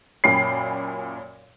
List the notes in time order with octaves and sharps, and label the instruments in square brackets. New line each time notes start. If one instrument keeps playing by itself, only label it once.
[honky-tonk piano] F#2 A#2 C#4 G5 B5 C7